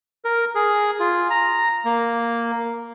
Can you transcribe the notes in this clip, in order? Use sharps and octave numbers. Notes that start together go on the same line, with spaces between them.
A#4
G#4
F4
A#5
A#3